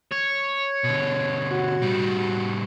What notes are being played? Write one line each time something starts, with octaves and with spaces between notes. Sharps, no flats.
C#5
B2 D3
F#4
A2 G3